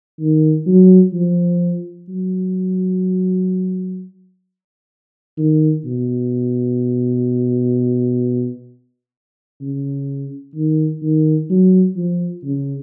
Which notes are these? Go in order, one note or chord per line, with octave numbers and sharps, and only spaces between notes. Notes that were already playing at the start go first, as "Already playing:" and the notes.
D#3
F#3
F3
F#3
D#3
B2
C#3
D#3
D#3
F#3
F3
C#3